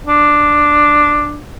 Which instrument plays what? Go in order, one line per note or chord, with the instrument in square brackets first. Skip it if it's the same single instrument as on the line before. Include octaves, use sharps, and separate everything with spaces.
[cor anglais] D4